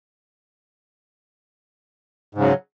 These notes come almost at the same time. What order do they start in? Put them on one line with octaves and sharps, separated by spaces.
G#2 C#3 F#3